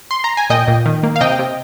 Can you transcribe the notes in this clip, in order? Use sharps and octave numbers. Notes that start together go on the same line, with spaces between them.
C6
A#5
G#5
A#2 D#5 G5
A#2
D#3
A#3
F5
C3 D#5 G5
C3